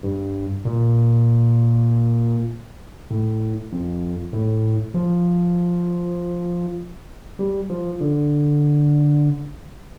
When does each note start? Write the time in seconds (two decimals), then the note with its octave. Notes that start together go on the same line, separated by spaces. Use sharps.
0.03 G2
0.65 A#2
3.10 A2
3.72 F2
4.33 A2
4.94 F3
7.39 G3
7.70 F3
8.00 D3